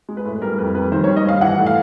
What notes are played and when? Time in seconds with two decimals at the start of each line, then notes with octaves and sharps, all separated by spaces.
0.09 G#3
0.17 B4
0.25 A2
0.42 G3 A#4
0.58 F2 B4
0.75 G3 B4
0.92 D#3 C5
1.04 C#5
1.08 G3
1.17 D#5
1.25 G2 F5
1.41 E3 F#5
1.58 A2
1.66 F5